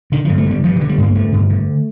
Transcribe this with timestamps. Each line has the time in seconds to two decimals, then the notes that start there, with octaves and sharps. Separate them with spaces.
0.12 D3 D#3
0.25 F3
0.29 G2
0.38 A3
0.46 D3 G3
0.64 G2 F3
0.76 D#3
0.81 D3
0.89 G3
0.98 G2 A#3
1.15 D3 A3
1.32 G2
1.50 D3